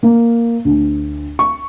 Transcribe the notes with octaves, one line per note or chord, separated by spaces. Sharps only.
A#3
D2
C#6